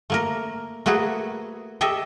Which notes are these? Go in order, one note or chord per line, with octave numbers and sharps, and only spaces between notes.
A3 A#3 A#4
A3 A#3 F#4 G#4 B4
G4 A4 D#5 E5